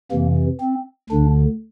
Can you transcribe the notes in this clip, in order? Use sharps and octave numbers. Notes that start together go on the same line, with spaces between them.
F2 C3 E3 A#3
C4
D2 D3 D4